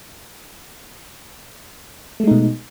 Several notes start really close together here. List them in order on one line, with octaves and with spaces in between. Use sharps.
A3 G#3 D#4 B2